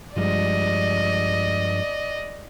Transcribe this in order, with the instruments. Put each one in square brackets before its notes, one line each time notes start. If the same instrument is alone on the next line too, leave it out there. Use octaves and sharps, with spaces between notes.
[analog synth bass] G2 [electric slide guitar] F3 G3 G#3 [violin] D5 D#5